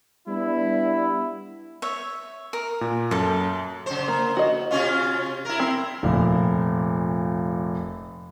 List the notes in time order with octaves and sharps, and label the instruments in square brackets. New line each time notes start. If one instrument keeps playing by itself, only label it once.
[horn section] G3 B3 D4 E4
[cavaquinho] C#5 E5
A#4
[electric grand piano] A#2
[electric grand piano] F#2 [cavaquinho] A4 A5
[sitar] C#3 C5
[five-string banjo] A#3
F#4 D#5
[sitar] C3 C#4 F4
E4 A#4
[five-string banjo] C4
[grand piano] F1 A#2